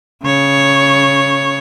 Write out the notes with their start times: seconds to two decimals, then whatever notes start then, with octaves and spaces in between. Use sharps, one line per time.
0.23 C#3 C#5